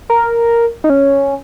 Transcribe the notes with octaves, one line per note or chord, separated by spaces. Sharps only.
A#4
D#4
C#4